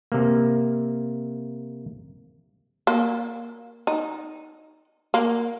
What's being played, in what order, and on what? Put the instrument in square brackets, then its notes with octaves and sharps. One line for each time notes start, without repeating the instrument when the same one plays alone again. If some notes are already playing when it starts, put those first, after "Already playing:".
[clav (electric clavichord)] C3 A#3
[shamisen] A#3
D#4
A#3